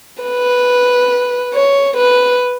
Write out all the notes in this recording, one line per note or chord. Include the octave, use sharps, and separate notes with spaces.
B4
C#5
B4